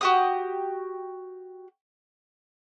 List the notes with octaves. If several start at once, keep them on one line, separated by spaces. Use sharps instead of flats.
F#4 G4 D#6